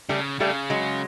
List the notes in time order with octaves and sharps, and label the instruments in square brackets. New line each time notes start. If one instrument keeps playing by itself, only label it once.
[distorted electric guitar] C#3 [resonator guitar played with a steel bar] G3 A3
[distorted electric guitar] C#3 [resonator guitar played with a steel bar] G3 A3
[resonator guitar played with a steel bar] F#3 G#3